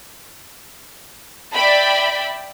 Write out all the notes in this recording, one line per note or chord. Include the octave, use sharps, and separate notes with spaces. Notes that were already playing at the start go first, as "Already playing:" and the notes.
D5 E5 G5 B5